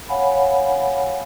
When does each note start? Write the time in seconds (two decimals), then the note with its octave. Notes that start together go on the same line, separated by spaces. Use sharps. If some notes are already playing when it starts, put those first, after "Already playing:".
0.09 C#5 F5 F#5 G#5 B5